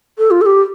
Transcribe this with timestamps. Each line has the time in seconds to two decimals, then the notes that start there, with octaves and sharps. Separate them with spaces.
0.18 A4
0.31 F4
0.41 A4
0.46 G4